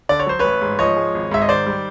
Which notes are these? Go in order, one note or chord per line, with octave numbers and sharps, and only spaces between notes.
D3 D5
C#5
F#3 C5
A1 B4 C#5
G#2
F3 C#5 D#5
G#3
G#1
G#2 E5
D#5
D#3 C5 D5
G3